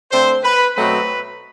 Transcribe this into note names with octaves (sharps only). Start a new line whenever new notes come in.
D3 A3 C4 C5
B4
B2 F#3 A3 C4 B4